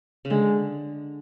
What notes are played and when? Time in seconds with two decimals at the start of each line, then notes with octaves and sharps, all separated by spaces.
0.25 C#3
0.30 D3 G#3